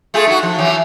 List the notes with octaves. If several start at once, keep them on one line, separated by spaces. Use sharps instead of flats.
A3 F4 G#4
D#4 F#4
F3
E3 F#3